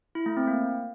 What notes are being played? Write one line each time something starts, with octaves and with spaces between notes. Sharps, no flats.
E4
A3
C4
A#3